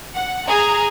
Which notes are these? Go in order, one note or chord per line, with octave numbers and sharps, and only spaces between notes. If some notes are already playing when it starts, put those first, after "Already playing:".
F#5
G#4 A#5